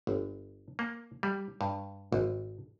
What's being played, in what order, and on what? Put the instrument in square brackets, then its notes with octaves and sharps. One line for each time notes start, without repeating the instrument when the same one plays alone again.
[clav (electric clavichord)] G1
A#3
G3
G2
G#1